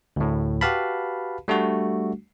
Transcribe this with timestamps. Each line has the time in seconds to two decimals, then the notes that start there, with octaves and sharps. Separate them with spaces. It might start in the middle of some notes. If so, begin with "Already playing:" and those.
0.16 D2 A2
0.61 F#4 G4 B4 F5 A5 B5
1.48 G3 A3 D4 F#4